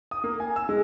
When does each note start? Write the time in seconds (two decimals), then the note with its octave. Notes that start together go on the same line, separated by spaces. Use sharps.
0.11 D#6
0.24 A#3
0.40 G#5
0.56 E6
0.69 G#3